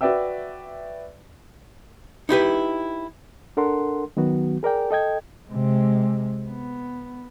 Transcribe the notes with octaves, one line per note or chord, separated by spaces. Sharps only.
F#4 B4 D5 E5 G5 E6
D#4 E4 G4 B4
D4 A4 A#4 F#5 C6
D#3 F#3 B3 F#4
G#4 A#4 D5 G5
A4 D#5 G5 G#6
C3 G#3
B3